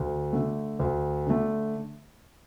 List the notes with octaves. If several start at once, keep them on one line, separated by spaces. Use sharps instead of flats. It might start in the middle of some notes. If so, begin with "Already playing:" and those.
Already playing: D2
D3 A3
D2
D3 A3